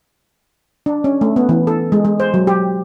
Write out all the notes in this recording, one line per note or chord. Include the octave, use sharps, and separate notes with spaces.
D4
C#4
A3
B3
E3
A4
G#3
G#3
C5
F#3
G4